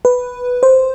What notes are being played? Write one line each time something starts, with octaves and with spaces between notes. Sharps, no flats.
B4
C5